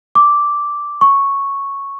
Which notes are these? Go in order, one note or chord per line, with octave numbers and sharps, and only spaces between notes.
D6
C#6